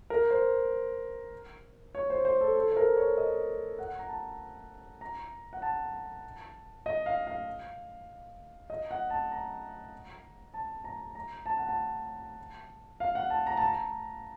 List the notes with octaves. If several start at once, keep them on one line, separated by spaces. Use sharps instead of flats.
A#4
C5
C#5
C5
C5
A4
A4
C5
A#4
C#5
D#5
F#5
A#5
A5
A#5
F#5
A5
D#5
F5
F5
D#5
F#5
A5
A#5
A5
A#5
A#5
A5
F#5
A5
F5
F#5
A5
A#5
A5
A#5